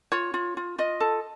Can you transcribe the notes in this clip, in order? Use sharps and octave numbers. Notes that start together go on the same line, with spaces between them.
F4 C#5
F4
F4
F4 D#5
A4